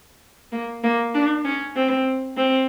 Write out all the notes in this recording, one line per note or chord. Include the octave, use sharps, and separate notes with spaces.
A#3
A#3
D4
C#4
C4
C4